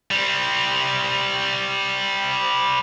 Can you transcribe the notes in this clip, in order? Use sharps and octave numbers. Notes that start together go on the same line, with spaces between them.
G3 C4